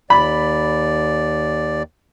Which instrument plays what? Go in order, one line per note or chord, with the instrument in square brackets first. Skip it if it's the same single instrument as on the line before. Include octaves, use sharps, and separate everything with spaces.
[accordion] D#2 D5 [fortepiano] B5